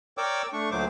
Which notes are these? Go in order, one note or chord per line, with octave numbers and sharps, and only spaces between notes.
A#4 C#5 D5 G5 D6 E6
A3 D4 C#6
D2 A#2 F#3 A3 C5 D6